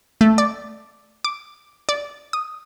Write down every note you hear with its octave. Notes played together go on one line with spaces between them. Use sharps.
A3
D5
D6
D5
D#6